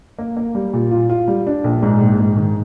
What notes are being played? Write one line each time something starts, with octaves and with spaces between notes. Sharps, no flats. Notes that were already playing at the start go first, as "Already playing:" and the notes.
A#3
A#3
G3
A#2
F4
F4
G3
D4
A#1
G#2
A#1
G#2
D#3